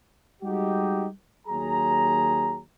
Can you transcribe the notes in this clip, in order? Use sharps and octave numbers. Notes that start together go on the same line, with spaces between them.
G3 G#3 D#4 F#4 G4
D#2 F#3 G#4 A#5